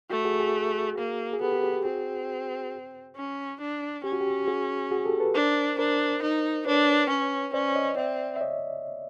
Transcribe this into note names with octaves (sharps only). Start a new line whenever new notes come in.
A3 F#4
F#4 G#4
F#4 G#4
A#3
G#4
B3 G4 A4
G4
G4
G4
C4 F#4 G#4
C#4
D4
C#4 G4
F#4
G4
F#4 G#4
F#4 G#4
G4 A4
A4 B4
D4 A#4 C5
D4 A#4 C5
D#4
D4 B4 C#5
C#4
C#4 C5 D5
C#5 D#5
C4 D5 E5
E5
C#5 D#5